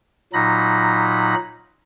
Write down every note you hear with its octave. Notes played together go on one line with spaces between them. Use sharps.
A#2 F#3 D#4 B5 A#6